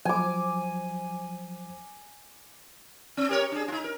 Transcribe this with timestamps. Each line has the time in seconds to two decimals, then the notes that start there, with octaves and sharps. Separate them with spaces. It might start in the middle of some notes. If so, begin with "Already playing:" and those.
0.05 F3 F#3 C5 G#5 D6
3.17 C4
3.29 G4 A#4 C#5
3.52 D4 G#4
3.68 D#4 F4
3.84 A#4